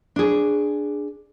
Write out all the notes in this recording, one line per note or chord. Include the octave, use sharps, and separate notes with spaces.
D4 G#4